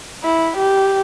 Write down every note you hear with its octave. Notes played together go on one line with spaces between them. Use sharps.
E4
G4